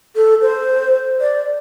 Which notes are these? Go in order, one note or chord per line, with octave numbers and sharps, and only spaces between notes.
A4
C5
D5